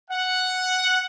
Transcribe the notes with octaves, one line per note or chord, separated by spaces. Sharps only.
F#5